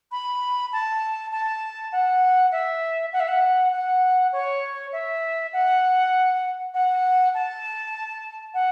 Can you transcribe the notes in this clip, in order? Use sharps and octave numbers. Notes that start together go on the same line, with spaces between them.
B5
A5
A5
F#5
E5
F#5
E5
F#5
F#5
C#5
E5
F#5
F#5
A5
F#5